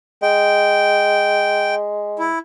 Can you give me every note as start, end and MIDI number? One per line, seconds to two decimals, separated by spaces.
0.22 2.28 56
0.22 1.75 79
2.19 2.39 64